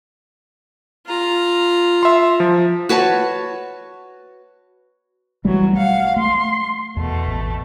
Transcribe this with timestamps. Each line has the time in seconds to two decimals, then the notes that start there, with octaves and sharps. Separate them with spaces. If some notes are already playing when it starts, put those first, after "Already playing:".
1.07 F4 A#5
2.03 E5 C6
2.40 F3
2.89 F#4 B4 C#5 A5
5.45 B1 E3 F#3 G3 A3
5.75 F5 F#5
6.16 A3 C6
6.97 E2 B2 A3
7.27 A1